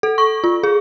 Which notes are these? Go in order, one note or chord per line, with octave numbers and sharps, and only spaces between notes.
A4
C#6
F4
G#4